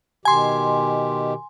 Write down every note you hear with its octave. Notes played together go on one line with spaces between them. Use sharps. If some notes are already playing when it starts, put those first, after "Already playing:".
B2 D#3 G4 G#5 C6